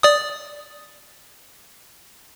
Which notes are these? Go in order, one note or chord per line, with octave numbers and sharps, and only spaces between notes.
D5 D#6